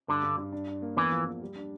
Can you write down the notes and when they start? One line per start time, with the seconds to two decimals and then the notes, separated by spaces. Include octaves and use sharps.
0.08 G2 D3
0.23 G2
0.38 G2
0.52 D4
0.68 D4
0.82 A#3
0.97 E2 E3
1.12 F3
1.27 E2
1.42 G3
1.56 D4